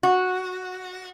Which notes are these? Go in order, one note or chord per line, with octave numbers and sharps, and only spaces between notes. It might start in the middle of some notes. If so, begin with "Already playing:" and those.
F#4